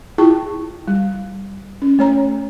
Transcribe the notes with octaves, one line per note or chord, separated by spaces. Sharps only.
E4 F4 G#4 G5 A5 C#6
G3
C#4
A3 C#5 A#5